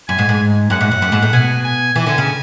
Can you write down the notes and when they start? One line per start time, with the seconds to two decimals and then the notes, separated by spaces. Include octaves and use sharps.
0.08 F#2 G#5
0.19 G#2
0.29 G#2
0.70 F#2 F#5
0.81 G#2
0.91 F#2
1.02 F#2
1.12 G#2
1.22 A2
1.33 B2 G#5
1.64 G#5
1.95 E3 G#5
2.06 D3
2.18 C#3